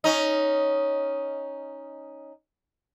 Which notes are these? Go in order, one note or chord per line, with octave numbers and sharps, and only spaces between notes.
C#4 D#4